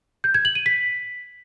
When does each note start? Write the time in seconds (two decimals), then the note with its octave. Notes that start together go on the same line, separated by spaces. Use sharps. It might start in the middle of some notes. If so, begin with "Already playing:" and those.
0.24 G6
0.34 G#6
0.45 F#7
0.55 D#7
0.66 B6